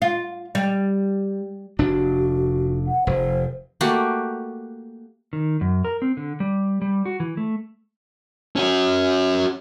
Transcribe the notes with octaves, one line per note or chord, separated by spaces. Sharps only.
F4
G3
F1 D4 F#4
F#5
F1 C5
A3 A#3 F#4 G4
D#3
F#2
A#4
C4
D3
G3
G3
F#4
E3
A3
C#4 F#4